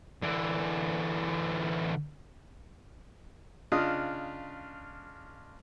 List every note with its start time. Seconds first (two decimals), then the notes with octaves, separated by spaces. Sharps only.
0.22 D3 E3
3.72 C#3 D4 F4 D#5 D#6